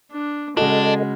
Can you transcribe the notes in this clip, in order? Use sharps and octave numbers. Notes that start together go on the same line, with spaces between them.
D4
C#3 G#3 D4 F#4 A4 D#5